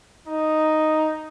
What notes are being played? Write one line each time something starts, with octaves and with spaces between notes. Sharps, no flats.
D#4